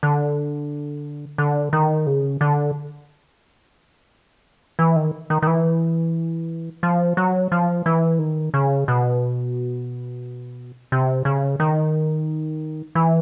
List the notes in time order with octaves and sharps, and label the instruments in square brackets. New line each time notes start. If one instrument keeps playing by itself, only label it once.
[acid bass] D3
D3
D#3
C#3
D3
E3
D#3
D#3
D#3
E3
F3
F#3
F3
E3
D#3
C#3
B2
C3
C#3
D#3
E3